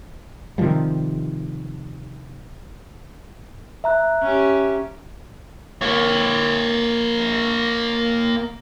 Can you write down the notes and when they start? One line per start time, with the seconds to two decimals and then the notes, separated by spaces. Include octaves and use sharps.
0.58 C3 D#3 F3 G3
3.84 E5 A#5 F#6
4.22 C#4 G4
5.81 A#3 C#5